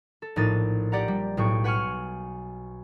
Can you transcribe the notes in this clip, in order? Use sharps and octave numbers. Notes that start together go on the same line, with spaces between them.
A4
A#1 A2 D#4 A6
G4 D5 F#5 A#5
G3
B1 A2 G5 C#6
B4 F#5 G#5 C#6 F6